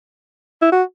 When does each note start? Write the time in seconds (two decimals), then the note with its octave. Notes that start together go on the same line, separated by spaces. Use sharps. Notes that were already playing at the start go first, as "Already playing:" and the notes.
0.61 E4
0.72 F#4